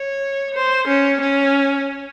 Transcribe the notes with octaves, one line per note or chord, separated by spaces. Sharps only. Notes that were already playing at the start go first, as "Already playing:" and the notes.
Already playing: C#5
C5
C#4
C#4